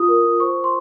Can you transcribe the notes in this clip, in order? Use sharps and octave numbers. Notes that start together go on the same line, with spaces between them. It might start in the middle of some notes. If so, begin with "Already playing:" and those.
Already playing: F4 D#6
A#4
F4
C5 C#6
C5
C6